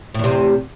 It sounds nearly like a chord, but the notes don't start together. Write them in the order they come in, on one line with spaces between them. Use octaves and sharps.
A2 E2 C3